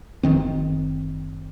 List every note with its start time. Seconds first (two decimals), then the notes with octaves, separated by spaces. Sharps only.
0.23 F#1 C#2 D#3 C4